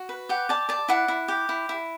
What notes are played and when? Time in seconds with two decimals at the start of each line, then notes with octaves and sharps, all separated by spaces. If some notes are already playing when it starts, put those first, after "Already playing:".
Already playing: F#4
0.09 B4
0.29 G4 F#5
0.49 D5 A5
0.69 D5 A5
0.88 E4 F#5
1.08 E4
1.28 G4
1.49 E4
1.69 E4